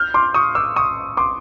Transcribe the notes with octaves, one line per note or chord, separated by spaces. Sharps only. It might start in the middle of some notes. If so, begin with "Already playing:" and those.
Already playing: F6 G6
C6 D6
C#6 D#6
D6 E6
C#6 D#6
C6 D6